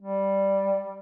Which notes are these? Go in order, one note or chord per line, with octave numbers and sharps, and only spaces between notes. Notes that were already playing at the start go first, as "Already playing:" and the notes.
G3